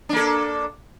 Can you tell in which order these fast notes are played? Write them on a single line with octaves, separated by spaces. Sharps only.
D4 A#3 A4